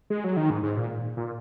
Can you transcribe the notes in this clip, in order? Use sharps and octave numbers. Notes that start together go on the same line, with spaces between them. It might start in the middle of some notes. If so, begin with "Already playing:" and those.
G#3
F#3
D#3
G#2
G#2
A#2
A#2